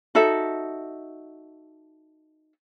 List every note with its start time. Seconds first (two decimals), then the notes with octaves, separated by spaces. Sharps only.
0.15 D#4 F#4 A4 E5